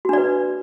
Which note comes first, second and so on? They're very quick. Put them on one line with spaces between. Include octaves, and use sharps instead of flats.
F#4 D4 D5 B4